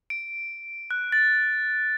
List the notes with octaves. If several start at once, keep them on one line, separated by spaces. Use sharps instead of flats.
D7
F#6
A6